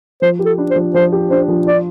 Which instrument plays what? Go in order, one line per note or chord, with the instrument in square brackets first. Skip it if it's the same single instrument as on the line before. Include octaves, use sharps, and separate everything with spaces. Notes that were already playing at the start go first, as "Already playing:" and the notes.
[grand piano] F3 [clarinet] C5
[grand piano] G4
[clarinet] A4
[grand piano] D4
[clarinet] C5
[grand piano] F3
[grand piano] F3 [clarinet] C5
[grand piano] G4
[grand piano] D4 [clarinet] C5
[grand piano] F3
[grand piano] F4 [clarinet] D5